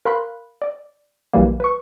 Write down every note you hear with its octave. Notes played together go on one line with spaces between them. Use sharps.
A#4 F5 B5 C6 F#6
D5
A#1 E3 F#3 G3 A#3
B4 C#6